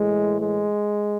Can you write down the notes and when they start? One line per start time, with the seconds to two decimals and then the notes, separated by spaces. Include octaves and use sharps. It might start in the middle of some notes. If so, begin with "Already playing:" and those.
Already playing: A2 E3 G#3
0.40 G#3